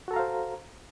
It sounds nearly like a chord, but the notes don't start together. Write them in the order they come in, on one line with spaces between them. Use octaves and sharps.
F#4 A4 A#5 F5 C5